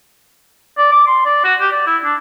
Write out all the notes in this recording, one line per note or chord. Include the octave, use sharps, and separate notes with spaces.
D5
D6
C6
D5
F#4
G4
D5
E4
D4